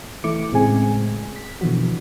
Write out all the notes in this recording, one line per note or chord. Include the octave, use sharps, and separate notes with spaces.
E3 A3 E4 D6 C#7
A2 C#3 G#3 C4 G#4 G#5
B6
B2 D3 E3 F3 F#4